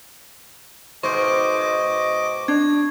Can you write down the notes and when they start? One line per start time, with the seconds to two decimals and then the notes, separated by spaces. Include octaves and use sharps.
1.03 G#2 B2 C5 D#5 C#6 D6
2.48 D4 G#6